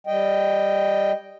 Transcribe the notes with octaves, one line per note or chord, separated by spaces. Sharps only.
G3 D#5 G5